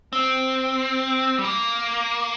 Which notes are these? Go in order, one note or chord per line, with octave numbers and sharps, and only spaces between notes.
C4
G3
A#3